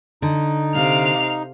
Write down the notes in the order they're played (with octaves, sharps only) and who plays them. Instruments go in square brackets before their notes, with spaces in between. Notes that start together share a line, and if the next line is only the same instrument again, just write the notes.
[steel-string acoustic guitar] D3 [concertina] D#4
[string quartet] C3 F5 F6